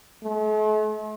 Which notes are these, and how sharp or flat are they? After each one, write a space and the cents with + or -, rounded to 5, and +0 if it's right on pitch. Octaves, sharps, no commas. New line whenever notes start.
A3 -45